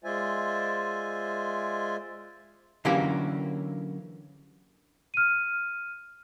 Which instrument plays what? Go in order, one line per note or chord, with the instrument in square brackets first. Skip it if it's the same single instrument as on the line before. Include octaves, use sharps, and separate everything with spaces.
[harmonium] G#3 F4 C5 D5 E5 G#5
[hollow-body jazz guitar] D3 E3 F#3 A#3 C#4 G4
[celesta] F6 D#7